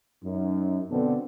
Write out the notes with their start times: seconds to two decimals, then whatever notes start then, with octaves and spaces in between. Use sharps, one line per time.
0.23 F#2 D#4
0.90 B2 D3 B3 C4 D4 A4